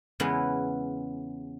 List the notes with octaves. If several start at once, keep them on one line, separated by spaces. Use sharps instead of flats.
E2 C#3 E3 G#3 B3 E4